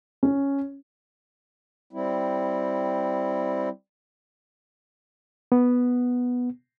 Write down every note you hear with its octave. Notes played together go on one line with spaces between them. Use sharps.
C#4
G3 C4 E4
B3